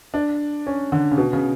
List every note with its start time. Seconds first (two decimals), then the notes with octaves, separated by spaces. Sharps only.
0.14 D4
0.67 C#4
0.92 D3
1.11 C#3
1.18 B2
1.33 C#3